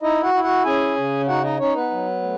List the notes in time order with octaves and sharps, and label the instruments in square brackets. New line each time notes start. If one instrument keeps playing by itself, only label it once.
[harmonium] D#4 E4 D#5
F#4 F#5
E4
F#4 F#5
C#4 G#4 G#5
C#3
D#4 F#4 F#5
D#4 D#5
C#4 D#4 C#5
B3 B4
F#3
A3